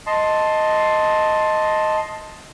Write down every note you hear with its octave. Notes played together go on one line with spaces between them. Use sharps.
D#5 A5 C6